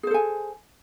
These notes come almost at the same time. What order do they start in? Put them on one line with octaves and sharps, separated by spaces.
G#4 C5 A4 G#5